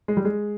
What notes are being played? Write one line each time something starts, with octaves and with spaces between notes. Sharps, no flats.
G#3
G3
G#3